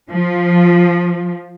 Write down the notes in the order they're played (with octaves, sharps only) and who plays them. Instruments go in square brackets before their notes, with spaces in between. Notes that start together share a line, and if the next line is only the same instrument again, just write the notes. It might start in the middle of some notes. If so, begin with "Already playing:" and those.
[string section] F3